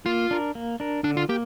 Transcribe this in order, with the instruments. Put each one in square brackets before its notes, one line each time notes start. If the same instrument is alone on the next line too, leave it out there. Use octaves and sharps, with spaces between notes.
[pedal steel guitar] A#3 [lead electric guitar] F4
[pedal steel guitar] D4 A#4
A#3
D4 A#4
[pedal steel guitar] D3 [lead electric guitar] D4
[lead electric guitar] F4
[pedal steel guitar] A#3 [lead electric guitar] G4